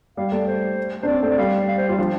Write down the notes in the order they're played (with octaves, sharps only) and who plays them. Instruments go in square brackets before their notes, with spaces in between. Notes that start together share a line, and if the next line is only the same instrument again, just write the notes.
[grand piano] G3 [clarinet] F5
[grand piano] A3 [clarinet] D5
[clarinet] C5
[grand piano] D4 [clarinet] C5
[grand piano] C4 [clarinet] D5
[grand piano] A3 [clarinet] C5
[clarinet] D5
[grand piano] G3 [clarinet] F5
[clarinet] F5
C5
[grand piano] G3 [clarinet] F4
[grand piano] F3 [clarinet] D4